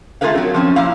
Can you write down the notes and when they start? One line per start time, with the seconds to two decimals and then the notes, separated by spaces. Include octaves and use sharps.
0.21 A3 F4 G#4 A#4 B4 F5
0.35 F#3 C4
0.54 F3 C4 C#4
0.76 A#2 E4 F5